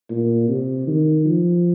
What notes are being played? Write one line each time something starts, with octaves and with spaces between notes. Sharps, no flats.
A#2
C3
D#3
F3